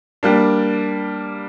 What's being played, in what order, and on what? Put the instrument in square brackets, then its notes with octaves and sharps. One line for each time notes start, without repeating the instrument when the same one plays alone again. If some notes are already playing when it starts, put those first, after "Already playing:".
[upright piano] G3 A#3 D4